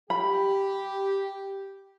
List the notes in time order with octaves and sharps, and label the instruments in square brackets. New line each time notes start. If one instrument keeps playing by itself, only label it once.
[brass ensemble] G4 [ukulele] B5